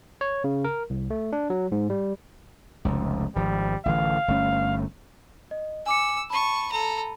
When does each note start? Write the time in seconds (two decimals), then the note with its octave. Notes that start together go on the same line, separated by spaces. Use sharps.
0.21 C#5
0.44 C#3
0.64 A#4
0.90 C2
1.10 A3
1.33 D4
1.50 F#3
1.72 G#2
1.90 G3
2.85 F1 C#2
3.36 G#1 F3 G3
3.86 A1 D3 E3 F5
4.28 G1 A3 C#4
5.51 D#5
5.86 G#5 D6 E6 C#7
6.30 A5 B5 C#6 D#7
6.72 A4 A#5